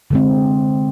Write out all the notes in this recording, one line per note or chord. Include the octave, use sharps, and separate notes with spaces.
D3 G#3 C4